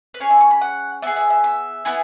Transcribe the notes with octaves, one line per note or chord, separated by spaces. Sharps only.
B4
C#4 G#4 C#5
E5
C#6
B5
F#5
B3 G#4 E5
E5
E5
E5
B3 E4 G#4